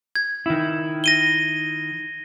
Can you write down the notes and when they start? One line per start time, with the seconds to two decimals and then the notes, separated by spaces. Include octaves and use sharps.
0.15 G#6
0.46 D#3 E4
1.04 A#6 D#7 G7